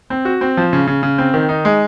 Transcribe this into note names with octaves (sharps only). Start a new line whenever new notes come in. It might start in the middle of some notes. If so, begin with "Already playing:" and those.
C4
F#4
C4
F3
C#3
C#3
C#3
C4
D#3
D#4
G#3